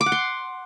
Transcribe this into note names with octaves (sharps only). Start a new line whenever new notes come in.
D6
F#5
C6